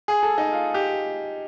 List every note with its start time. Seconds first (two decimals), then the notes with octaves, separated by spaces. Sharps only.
0.08 G#4
0.23 A4
0.38 D#4
0.52 F4
0.74 G4